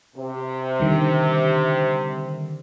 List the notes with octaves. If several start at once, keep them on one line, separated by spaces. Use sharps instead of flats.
C3
D3 D#3 G3